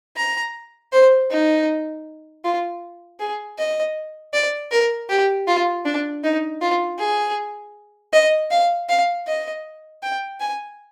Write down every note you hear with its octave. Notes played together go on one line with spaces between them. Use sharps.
A#5
C5
D#4
F4
G#4
D#5
D5
A#4
G4
F4
D4
D#4
F4
G#4
D#5
F5
F5
D#5
G5
G#5